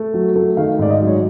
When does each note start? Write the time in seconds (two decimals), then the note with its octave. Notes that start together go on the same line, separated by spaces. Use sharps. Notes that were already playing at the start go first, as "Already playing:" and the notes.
Already playing: A3
0.14 F#3
0.36 A3
0.57 D#3 F5
0.79 G#2 D5
0.90 D#5
1.02 F#3
1.07 C#5